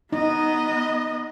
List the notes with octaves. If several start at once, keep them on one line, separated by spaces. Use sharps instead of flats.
B3 D#4 D#5